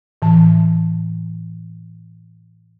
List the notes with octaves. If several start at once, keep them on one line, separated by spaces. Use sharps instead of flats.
A2 E3 A5